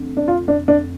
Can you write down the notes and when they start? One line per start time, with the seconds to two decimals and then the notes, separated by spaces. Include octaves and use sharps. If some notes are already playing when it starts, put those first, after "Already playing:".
Already playing: F1 F2 D3
0.17 D4
0.28 F4
0.48 D4
0.68 D4